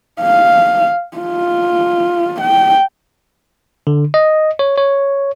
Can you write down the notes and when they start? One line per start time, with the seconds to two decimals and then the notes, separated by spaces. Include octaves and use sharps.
0.21 F5
1.18 F4
2.41 G5
3.87 D3
4.14 D#5
4.59 C#5
4.78 C#5